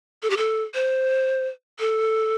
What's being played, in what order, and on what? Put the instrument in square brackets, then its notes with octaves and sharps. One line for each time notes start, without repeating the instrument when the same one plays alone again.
[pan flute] A4
G4
A4
C5
A4